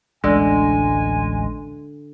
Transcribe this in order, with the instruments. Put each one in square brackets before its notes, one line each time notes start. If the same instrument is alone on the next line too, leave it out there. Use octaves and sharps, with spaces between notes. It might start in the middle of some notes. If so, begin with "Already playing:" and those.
[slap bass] A1 D2 A2 [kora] D3 [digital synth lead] G#3 [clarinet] G#5